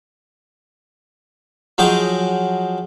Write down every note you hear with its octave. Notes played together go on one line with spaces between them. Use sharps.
F3 F#3 G#4 D#5 G5